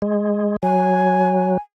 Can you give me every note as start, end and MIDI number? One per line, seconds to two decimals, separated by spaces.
0.02 0.56 56
0.63 1.57 54
0.63 1.59 80